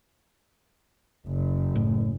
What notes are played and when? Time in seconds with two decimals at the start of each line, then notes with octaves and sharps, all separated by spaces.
1.27 F#1 F#2
1.75 A2